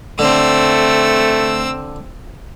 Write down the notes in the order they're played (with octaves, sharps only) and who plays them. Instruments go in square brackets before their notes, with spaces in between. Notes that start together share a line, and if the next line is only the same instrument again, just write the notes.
[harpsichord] D3 [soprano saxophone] A3 [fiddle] C4 E6